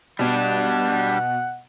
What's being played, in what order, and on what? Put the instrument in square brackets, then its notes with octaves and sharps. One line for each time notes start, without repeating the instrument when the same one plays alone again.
[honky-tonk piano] B2 [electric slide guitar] G3 D4 [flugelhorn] F#5